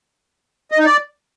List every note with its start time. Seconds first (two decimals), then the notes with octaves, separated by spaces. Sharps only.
0.71 D#5
0.78 D#4
0.85 D5